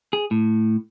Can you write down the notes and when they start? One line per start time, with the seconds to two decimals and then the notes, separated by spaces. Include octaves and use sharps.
0.13 G#4
0.31 A2